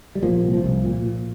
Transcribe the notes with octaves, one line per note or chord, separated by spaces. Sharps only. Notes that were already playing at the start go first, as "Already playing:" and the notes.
G3
A#2 F3 A#3
C2
F3
C2
A#2
A#2